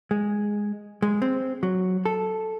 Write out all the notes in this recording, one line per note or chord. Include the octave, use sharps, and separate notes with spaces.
G#3
G#3
C4
F#3
A4